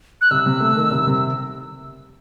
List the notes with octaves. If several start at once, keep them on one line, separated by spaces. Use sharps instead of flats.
F#6
C2 E6
C3
A3
D#3
C2
C3